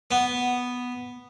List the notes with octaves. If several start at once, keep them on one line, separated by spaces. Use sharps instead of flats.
B3